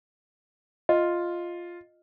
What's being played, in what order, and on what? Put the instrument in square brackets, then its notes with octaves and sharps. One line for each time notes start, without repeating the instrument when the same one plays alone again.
[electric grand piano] F4 [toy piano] D#5